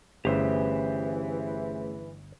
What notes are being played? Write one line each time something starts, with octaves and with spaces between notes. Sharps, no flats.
G1 E3 A3 C#4 G4 G#4 C5 E5